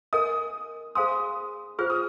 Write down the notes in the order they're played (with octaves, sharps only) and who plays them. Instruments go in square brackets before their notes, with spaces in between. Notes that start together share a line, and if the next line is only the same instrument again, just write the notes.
[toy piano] A#4 D#5 G#5 [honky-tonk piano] D#6
[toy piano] G#4 C5 F5 G#5 C6 [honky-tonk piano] D#6
[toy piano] F4 G#4 C5 [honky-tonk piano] F6
[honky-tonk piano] D#6